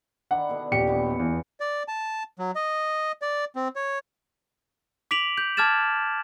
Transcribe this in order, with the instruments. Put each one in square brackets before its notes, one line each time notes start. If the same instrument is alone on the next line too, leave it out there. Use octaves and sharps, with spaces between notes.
[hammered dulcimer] D#3 D4 E4 [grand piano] F#5
[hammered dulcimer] B2 D3 E4
[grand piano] D#1 G4 C#7
[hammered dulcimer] B2 E3 C#4
[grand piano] E2 [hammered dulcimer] F3
[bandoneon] D5
A5
F#3
D#5
D5
C4
C#5
[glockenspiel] D6 B6 D7 F7 F#7
G6
A5 D6 F6 G#6 A6 E7